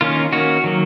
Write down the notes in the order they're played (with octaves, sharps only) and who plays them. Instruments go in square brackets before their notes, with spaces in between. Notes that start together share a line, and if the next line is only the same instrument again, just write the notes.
[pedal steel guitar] D#3 A#3 C#4 F4
D#3 A#3 C#4 F#4
D#3 F#3 A#3